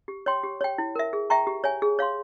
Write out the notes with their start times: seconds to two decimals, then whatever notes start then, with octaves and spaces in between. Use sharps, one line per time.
0.08 G4
0.26 C#5 G5 C6
0.44 G4
0.61 C#5 G5
0.78 E4
0.96 A#4 E5
1.13 G#4
1.30 E5 G5 A#5 C#6
1.47 G4
1.64 C#5 E5 G#5
1.82 G#4
1.99 C#5 F5 C6